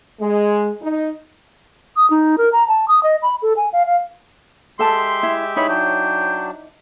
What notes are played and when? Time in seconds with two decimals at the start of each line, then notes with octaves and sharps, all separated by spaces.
0.21 G#3
0.82 D#4
1.97 D#6
2.10 D#4
2.38 A#4
2.52 A#5
2.68 A5
2.88 D#6
3.03 D#5
3.23 B5
3.42 A4
3.57 G#5
3.73 F5
3.86 F5
4.79 G#3 G4 A4 E5 A5 C6
5.23 E4
5.56 D#4 E4 C#5 B5
5.69 F#3 D4 G5